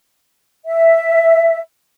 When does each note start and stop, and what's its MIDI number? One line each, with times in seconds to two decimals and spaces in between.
0.65 1.59 76